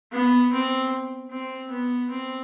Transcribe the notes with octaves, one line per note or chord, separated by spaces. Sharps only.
B3
C4
C4
B3
C4